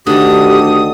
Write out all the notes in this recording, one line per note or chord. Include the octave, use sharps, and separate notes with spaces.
D2 D3 D#3 G4 D#6